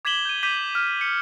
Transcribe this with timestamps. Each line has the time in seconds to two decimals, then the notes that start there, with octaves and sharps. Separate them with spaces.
0.05 D6 G#6 B6 E7 F#7 G7
0.25 G6 D#7
0.43 D6 G6 B6 D#7
0.75 F6
1.01 C#7